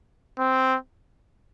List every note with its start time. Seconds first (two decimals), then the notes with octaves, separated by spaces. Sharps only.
0.39 C4